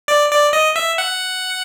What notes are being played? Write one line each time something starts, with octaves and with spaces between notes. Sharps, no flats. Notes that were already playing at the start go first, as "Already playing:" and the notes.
D5
D5
D#5
E5
F#5